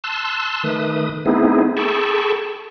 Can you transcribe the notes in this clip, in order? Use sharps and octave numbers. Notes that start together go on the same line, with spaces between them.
A5 C6 E6 F#6
D#3 A3 B4 D#6
A3 B3 C4 D#4 E4 G#4
G#4 A4 G5 A5 B5 C#6